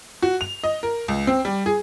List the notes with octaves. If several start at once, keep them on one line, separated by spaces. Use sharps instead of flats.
F#4
F7
D#5
A#4
C#2
C4
G3
G#4